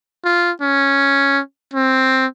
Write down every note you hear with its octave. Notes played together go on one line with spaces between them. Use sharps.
F4
C#4
C4